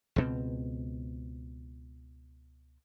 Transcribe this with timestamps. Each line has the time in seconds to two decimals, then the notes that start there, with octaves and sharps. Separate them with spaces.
0.16 C#2 B2 C4